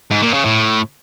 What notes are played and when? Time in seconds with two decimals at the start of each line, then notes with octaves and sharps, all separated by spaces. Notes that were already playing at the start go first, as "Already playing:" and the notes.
0.11 G#2
0.22 A#2
0.33 C#3
0.45 A2